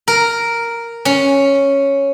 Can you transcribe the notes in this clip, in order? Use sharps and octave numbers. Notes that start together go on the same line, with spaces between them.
A#4
C#4